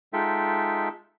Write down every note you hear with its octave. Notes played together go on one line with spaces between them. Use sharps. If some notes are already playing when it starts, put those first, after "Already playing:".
G#3 D#4 F4 A4 E5 G5